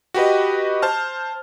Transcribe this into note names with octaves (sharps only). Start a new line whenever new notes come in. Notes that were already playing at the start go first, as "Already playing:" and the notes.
F#4 G4 B4 D#5
C5 A5 F6